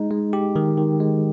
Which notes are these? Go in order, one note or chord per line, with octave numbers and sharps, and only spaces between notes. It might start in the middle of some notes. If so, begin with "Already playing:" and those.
Already playing: G#3 D#4
G#3
G4
D#3
D#3
G#3